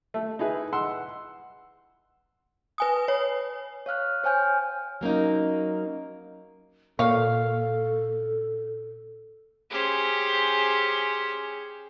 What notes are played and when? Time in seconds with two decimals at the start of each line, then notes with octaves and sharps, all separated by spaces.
0.14 A3
0.39 D#4 E4 G#4 B4
0.73 F#5 C6 E6
2.78 B4 G#5 D#6
3.08 C#5
3.86 C#5 F5 F6 F#6
4.24 C5 C#5 G5 G#5 F6 G6
5.01 F#3 A#3 C#4 D#4
6.99 A#2 A4 C#5 F5
9.70 C#4 G4 G#4 C5